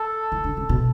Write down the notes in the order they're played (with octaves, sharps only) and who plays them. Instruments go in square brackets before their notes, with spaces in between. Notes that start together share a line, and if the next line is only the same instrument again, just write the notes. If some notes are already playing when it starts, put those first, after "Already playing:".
Already playing: [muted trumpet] A4
[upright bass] E3
D3
C#3
B2